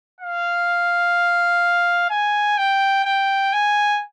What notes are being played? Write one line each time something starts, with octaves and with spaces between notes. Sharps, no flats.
F5
G#5
G5
G5
G#5